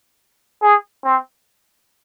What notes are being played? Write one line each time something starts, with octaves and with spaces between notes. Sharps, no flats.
G#4
C4